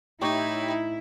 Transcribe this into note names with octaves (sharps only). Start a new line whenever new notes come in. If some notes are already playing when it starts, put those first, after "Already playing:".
A2 D#4 E4 G4 C#5 G5